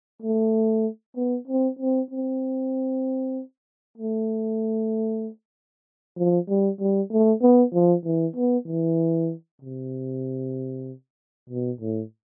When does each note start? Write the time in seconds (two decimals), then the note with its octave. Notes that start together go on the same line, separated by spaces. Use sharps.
0.22 A3
1.16 B3
1.48 C4
1.79 C4
2.11 C4
3.98 A3
6.17 F3
6.48 G3
6.80 G3
7.11 A3
7.42 B3
7.73 F3
8.05 E3
8.36 B3
8.67 E3
9.62 C3
11.50 B2
11.81 A2